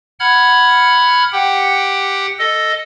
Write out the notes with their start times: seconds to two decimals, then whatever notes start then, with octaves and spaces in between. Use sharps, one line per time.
0.20 F#5 B5 F6 G#6
1.32 G4 F#5 G5
2.39 A4 D#5